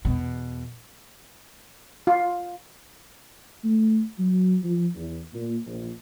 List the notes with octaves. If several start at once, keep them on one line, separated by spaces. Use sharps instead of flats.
E2 B2
F4
A3
F#3
F3
E2
A#2
A#1